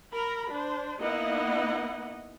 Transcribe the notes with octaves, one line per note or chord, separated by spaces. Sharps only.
A#4 A#5 B5
D4 C5
A#3 B3 D#4 E4 D#5 F#5